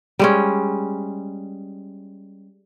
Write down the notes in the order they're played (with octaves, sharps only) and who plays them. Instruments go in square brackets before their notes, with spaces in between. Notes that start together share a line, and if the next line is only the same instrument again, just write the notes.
[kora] G3 G#3 C#4